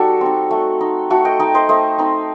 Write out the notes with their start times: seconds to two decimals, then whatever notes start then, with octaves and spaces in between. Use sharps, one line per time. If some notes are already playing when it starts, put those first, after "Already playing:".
Already playing: G3 D#4 F#4 A4
0.21 C4 D#4
0.51 A3
0.81 D#4
1.10 A3 F#4 A4
1.25 D#5 G5
1.39 D#4 D#5 G5
1.55 C5 D#5
1.69 A3 C5 D#5
1.98 C4 D#4